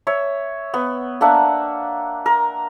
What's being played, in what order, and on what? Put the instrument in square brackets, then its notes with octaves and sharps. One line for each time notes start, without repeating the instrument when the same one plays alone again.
[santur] C#5 E5
B3
A#3 D4 E5 F#5
A#4